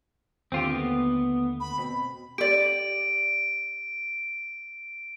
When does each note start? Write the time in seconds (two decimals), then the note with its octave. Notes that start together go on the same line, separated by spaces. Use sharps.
0.52 D#2 D3 A3 C4 F4 G4
0.70 B3
1.60 B5
1.78 B2 C4 B6
2.38 G4 D5 D7